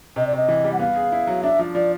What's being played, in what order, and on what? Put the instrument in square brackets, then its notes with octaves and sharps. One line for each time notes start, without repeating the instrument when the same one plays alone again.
[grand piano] C3 [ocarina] D#5
[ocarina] D5
[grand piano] C3 [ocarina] D#5
[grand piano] E3
G3
[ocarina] F#5
[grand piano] B3 [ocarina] F5
[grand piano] G#4
E4
F#3
[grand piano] D4 [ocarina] E5
[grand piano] F3
[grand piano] F3 [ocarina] D5